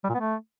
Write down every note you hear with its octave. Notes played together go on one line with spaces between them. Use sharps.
G3
A#2
B3
A3